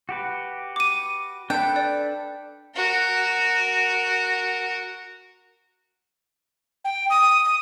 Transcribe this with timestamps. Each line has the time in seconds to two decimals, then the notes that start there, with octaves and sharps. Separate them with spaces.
0.09 F#4 G4 B4
0.76 D6 D#7
1.50 D4 A4 B4 G5
1.76 D5
2.75 F#4 A#4
6.85 G5
7.10 D#6
7.45 D#6